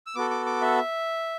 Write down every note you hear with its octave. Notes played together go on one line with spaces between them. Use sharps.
E6
B3 F#4 A4 D6
D6
D6
E5